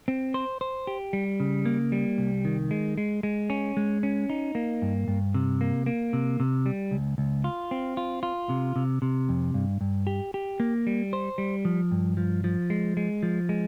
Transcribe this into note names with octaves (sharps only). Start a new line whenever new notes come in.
C4
C5
C5
G4
G3
C#3
A#3
G3
C2
D#3
G#3
G#3
G#3
C#4
G#3
C#4
D#4
A#3
G2
G2
C3
A#3
A#3
C3
C3
G3
C#2
C#2
F4
C4
F4
F4
C3
C3
C3
F2
G2
G2
G4
G4
A#3
G3
C5
G3
F3
G2
F3
F3
G#3
G#3
F3
G#3